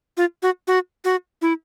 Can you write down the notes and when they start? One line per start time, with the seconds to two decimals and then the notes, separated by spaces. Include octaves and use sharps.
0.17 F4
0.43 F#4
0.68 F#4
1.05 F#4
1.42 E4